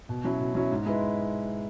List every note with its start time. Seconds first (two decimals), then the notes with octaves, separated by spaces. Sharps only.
0.09 B2
0.24 F#3 C#4 E4
0.40 B2
0.55 F#3 C#4 E4
0.71 G#2
0.86 G#3 E4 B4